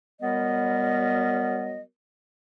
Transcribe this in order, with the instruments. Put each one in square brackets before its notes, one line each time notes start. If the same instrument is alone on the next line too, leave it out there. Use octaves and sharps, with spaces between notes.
[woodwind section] F#3 G3 B3 A#4 D#5